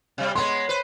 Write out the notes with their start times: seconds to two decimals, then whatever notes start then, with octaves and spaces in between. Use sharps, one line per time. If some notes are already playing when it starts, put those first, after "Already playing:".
0.18 C3 G3
0.35 G#3 B3 C#5 C6
0.69 B4 C5